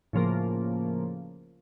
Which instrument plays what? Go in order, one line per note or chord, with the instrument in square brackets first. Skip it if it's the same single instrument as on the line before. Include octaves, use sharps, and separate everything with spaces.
[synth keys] A2 C#3 F3 A#3